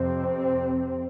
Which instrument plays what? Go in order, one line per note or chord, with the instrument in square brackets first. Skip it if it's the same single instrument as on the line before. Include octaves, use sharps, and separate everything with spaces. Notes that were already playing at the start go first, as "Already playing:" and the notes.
Already playing: [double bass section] F2 C3 C4